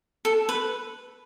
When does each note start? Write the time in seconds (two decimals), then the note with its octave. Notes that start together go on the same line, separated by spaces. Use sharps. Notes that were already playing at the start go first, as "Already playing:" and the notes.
0.25 A4
0.49 B4